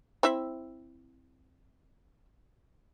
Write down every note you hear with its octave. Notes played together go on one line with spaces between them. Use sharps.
C4 E4 E5